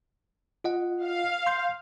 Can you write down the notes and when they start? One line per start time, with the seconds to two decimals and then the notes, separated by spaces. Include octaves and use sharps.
0.64 F4 D#5 F#5
1.04 F5
1.46 C6 G6 C7